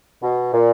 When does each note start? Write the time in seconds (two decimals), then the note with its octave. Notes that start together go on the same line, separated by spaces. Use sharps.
0.23 B2
0.54 A#2